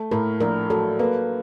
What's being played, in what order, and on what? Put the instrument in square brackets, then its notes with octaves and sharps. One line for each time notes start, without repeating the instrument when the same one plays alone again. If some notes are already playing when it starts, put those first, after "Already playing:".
Already playing: [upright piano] A3
[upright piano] A2 [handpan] A#4
[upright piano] A#1 [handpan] A#4
[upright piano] F#3 [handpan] A4
[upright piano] A#3 [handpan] B4